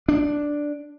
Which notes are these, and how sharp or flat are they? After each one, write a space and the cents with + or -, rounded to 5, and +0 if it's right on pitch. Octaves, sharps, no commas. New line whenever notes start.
D4 +0